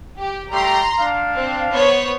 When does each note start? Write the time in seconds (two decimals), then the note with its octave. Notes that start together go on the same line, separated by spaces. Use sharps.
0.18 G4
0.51 G3 A3 G4 A#5 C6
1.00 D4 F5
1.33 C4
1.71 B3 C5 C#5